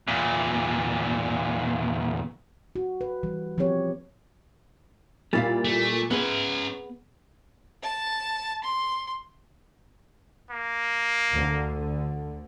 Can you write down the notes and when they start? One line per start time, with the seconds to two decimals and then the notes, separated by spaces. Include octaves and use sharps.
0.08 E2 A#2
2.76 F#4
3.01 B4
3.23 E3 G3
3.58 F3 B3 C4 G4 C#5
5.33 A#2 G3 E4 F5 A6
5.64 A3
6.11 B3 C#4 G#4 B4 E5 F#7
7.83 A5
8.64 C6
10.50 A#3
11.32 D2 D3